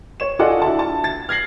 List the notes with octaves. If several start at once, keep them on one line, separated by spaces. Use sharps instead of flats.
C#5 E7
F4 G#4 A4 D5 D#5 F#5
D4 E4 F#4 A5
A5
A6
F6 G#6 A#6 C7 F#7